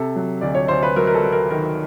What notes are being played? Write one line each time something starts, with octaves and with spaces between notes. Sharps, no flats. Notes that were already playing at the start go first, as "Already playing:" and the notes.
Already playing: C3 A4
F#3
D2 D5
C#5
D2 C5
B4
F#3 A#4
A#4
A4
F#3
A#4
D#3 A#4